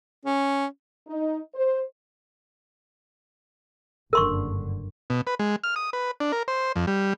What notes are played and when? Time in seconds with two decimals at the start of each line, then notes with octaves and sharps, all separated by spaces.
0.25 C#4
1.08 D#4
1.54 C5
4.13 F#1 G2 D3 A#4 C6 C#6
5.10 B2
5.27 B4
5.39 G#3
5.64 F6
5.76 D#6
5.93 B4
6.20 D4
6.32 A#4
6.48 C5
6.76 F2
6.87 G3